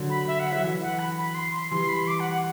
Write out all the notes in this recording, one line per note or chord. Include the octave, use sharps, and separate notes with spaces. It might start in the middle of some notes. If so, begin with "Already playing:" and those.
Already playing: D3 F#3
B5
E5
F#5
F#3 E5
E3
F#5
B5
B5
C6
C6
E3 G3 C6
B5
C6
D6
F#5
F#5